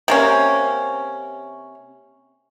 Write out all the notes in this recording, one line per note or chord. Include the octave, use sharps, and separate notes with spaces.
C3 A#3 C#4